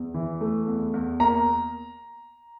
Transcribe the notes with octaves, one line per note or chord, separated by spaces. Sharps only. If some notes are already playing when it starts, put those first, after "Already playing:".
Already playing: E2
E3
A3
E2
E2
A#3 A#5